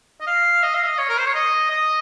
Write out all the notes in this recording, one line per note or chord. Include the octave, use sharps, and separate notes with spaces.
D#5
F5
D#5
F5
D#5
C#5
A#4
C5
C#5
D#5
D#5